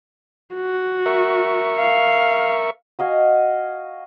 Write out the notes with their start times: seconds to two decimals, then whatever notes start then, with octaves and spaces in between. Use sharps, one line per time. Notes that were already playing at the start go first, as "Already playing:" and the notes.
0.55 F#4
1.06 A#4 E5 C#6
1.79 F5
2.99 F#4 D#5 F5 G#5